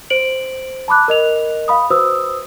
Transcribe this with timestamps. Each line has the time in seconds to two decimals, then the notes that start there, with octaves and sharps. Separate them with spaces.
0.10 C5 D7 F#7
0.88 A5 B5 D6 F#6
1.08 A#4 D#5 F7
1.68 F5 B5 D#6
1.90 F#4 B4 C5 D#6 E6